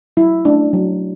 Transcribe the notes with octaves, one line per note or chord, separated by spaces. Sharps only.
F#3 E4
A3 C#4 D4
F#3